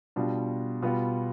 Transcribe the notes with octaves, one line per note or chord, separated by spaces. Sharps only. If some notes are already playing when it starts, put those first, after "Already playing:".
B2 G3 D4 F4
B2 G3 B3 F4